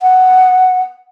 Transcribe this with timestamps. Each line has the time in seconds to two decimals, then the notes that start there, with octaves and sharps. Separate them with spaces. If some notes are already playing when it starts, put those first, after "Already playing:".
0.01 F#5